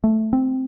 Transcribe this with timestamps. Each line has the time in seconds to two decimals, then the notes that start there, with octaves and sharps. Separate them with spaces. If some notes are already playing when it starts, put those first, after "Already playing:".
0.04 A3
0.33 C4